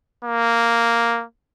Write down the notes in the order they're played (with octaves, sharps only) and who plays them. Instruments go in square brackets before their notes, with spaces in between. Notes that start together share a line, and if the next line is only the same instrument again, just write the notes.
[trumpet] A#3